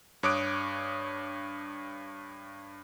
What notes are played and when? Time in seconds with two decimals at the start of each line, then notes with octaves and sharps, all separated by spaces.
0.23 G2 C#5 D6 D#6 F#6 D7